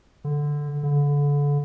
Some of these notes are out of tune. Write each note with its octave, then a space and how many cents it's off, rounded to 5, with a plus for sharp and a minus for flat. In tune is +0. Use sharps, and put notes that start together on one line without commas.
D3 +0
D3 -30